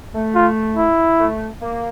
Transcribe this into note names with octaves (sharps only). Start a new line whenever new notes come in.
A3
F4
E4
A3
A#3